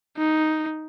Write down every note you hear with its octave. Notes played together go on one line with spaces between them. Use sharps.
D#4